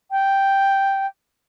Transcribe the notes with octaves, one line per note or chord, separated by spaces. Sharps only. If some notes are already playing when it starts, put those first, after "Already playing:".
G5